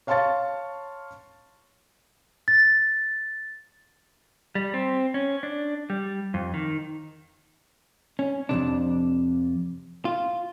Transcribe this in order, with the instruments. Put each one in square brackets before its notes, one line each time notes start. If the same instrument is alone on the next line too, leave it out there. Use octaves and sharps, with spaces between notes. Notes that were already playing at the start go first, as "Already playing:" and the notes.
[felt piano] C#5 F5 A5 C6 C#6 A6
[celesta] A6
[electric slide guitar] G3
C4
C#4
D4
G3
F2
D#3
[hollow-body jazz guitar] C#4
F2 A2 C3 D4
F4